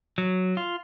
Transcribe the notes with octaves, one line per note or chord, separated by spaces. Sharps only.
F#3
F4